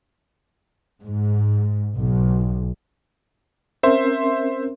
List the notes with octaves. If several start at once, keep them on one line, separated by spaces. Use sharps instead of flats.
G#2
B1
C4 C#4 A#4 C5 E5 C6